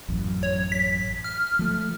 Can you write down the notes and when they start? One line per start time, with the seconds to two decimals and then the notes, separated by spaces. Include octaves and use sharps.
0.09 A1 F#2
0.43 C#5
0.72 B6
1.24 F6
1.59 F3 A3